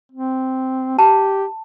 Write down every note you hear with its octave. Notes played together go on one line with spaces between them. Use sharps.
C4
G4 A5